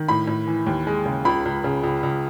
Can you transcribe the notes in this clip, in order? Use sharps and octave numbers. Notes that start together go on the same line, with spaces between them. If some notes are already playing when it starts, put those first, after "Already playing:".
Already playing: D#3
A2 B5
A2
E3
D#2
G#3
C#3
C#2 B5
C#2
C#3
C#2
C#2